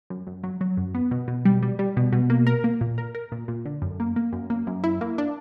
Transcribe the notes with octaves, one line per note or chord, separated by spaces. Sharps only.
F#2
F#2
F#3
F#3
F#2
B3
B2
B2
G3
G3
G3
B2
B2
A#3
A#4
A#3
A#2
A#4
A#4
A#2
A#2
D3
F#2
A#3
A#3
F#2
A#3
F#2
E4
A#3
D4